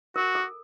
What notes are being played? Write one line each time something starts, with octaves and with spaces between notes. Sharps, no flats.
F#4 A#4
A4